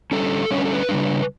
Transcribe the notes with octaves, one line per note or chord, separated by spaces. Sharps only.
D3 G3 C#4 A4
D3 G3 C#4 C#5
B4
A4
B4
C#3 G3 D4